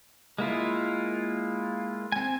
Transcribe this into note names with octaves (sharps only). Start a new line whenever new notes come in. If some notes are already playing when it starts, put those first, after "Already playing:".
G#3 A#3 E4 F4
C4 G#5